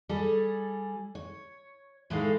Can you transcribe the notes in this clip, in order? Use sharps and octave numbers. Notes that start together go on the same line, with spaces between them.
G3 G#4 A4
C#5
A2 E3 G#3 D#4 A4 F5